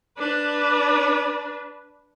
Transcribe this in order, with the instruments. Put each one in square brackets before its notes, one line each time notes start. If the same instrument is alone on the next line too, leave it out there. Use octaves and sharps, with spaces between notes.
[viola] D4 B4